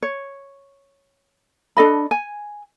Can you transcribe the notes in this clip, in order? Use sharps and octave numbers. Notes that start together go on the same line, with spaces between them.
C#5
D4 A4 D#5 B5
G#5